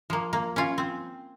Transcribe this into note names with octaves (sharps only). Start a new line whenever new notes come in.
F3 A#3
A#3
C#4 F4
C4